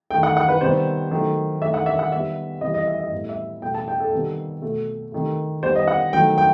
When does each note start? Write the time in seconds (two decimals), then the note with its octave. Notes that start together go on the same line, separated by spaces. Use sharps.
0.11 D#3 A3 G5
0.23 F#5
0.37 F#5
0.49 B4
0.61 C3 D#3 G3 B3 C5
1.11 D#3 F#3 A3
1.62 D#3 A3 E5
1.74 F#5
1.86 E5
1.99 F#5
2.12 D#3 G3 B3 E5
2.61 C3 E3 G3 D#5
2.74 D#5
2.87 E5
3.00 D#5
3.11 A2 G3 B3
3.29 E5
3.62 B2 A3 G5
3.75 A5
3.88 G5
4.00 A4
4.13 C3 D#3 G3 B3
4.62 B2 A3
5.12 C3 D#3 A3
5.63 D#3 G3 B3 C5
5.76 D#5
5.88 F#5
6.13 D#3 F#3 A3 G5
6.38 G5